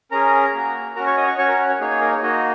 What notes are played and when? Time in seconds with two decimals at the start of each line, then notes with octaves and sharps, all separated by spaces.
0.11 C#4 G#4 A#4 A#5
0.54 A#3 F#4
0.96 C#4 F#4 A#4 A#5
1.06 C#5 C#6
1.17 D#5 D#6
1.27 C#5 C#6
1.38 C#4 F#4 C#5 C#6
1.48 A#4
1.59 C#5
1.70 C#5
1.80 A#3 D#4 G#4 C#5
1.91 C#5
2.01 A#4
2.12 C#5
2.22 A#3 D#4 F#4 D#5